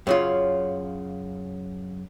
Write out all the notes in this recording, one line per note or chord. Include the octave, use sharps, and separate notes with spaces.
F#2 C#3 F4